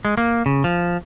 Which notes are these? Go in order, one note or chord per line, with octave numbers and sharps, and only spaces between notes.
G#3
A#3
C#3
F3